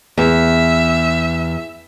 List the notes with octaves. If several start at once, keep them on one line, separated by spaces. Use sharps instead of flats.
E2 E5